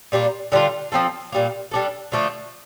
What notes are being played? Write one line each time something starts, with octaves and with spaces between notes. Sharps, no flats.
A#2 G3 A#3 D4
D3 G3 D4 F4
F3 C4 F4 A4
A#2 G3 A#3
G3 D4 A4
D3 F3 A3 D4